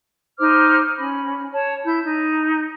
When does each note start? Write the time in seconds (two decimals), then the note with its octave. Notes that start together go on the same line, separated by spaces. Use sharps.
0.39 D#4 C5 D6 F6
0.97 C#4 B5
1.53 C#5 A5
1.84 E4 G6
2.04 D#4